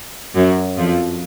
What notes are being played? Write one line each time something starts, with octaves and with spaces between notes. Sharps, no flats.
F#2 F#3
F2 F3